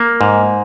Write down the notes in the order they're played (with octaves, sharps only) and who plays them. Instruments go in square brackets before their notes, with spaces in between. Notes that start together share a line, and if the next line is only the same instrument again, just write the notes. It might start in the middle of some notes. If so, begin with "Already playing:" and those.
Already playing: [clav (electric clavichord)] A#3
G#2